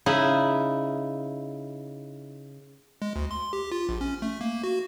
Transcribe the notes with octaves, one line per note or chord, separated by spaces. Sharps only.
C#3 D#4 E4
G#3
D2
C6
G4
F4
A#1
C#4
A3
A#3
F#4